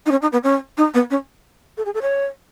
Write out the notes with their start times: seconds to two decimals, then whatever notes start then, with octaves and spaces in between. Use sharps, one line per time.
0.06 D#4
0.11 C#4
0.22 D#4
0.32 B3
0.44 C#4
0.77 D#4
0.94 B3
1.11 C#4
1.77 A4
1.85 G#4
1.94 A4
2.02 C#5